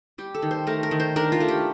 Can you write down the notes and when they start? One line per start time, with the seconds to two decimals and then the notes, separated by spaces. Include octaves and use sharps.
0.18 G3 G4
0.35 A4
0.42 D#3
0.51 C5
0.67 A3 A#4
0.83 A#4
0.91 D#3
1.00 C5
1.16 D4 A#4
1.32 F4
1.40 A3
1.48 G4